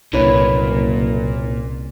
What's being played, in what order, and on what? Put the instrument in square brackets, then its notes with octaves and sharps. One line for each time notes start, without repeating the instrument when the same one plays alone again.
[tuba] F#1 [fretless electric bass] C2 [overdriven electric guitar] A#2 [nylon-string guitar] E4 B4 C#5